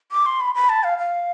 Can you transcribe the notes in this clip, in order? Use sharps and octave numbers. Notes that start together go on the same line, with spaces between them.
D6
C6
B5
B5
A5
F5
F5